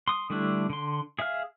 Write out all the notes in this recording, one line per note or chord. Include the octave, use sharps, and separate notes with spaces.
C6 D#6
D3 G3 A3 D4 E4
D3 C6
G#4 E5 F5 F6